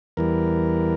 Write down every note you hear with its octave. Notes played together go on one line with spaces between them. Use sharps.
E2 E3 G3 A#4